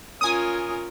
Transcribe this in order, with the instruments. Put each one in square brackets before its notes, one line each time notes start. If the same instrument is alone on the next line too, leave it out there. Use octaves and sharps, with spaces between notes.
[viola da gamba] C#4 F4 A#4 [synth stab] G#5 D#6